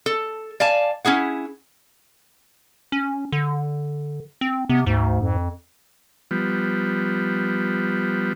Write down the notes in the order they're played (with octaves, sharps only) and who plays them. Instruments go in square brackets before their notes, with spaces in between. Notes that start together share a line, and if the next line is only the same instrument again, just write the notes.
[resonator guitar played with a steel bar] A4
D5 F5 G#5 A5
C#4 E4 G#4 F#5
[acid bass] C#4
D3
C4
[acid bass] C3 [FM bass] B3
[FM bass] D2 [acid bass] G#2
[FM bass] F2
[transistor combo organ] F3 G3 B3